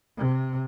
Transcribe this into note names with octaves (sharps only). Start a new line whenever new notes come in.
C3